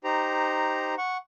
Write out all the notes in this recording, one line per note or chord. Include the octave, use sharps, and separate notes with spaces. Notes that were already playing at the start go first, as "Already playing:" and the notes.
D#4 G4 C5 A#5
F#5 C#6